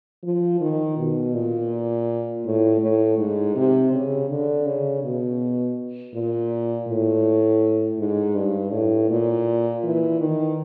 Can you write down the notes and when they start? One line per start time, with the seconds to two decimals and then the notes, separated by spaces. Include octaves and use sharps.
0.24 F3
0.61 D#3
0.98 B2
1.34 A#2
2.45 A2
2.81 A2
3.18 G#2
3.56 C3
3.93 C#3
4.30 D3
4.66 C#3
5.04 B2
6.14 A#2
6.88 A2
7.99 G#2
8.35 G2
8.72 A2
9.10 A#2
9.83 E3
10.20 D#3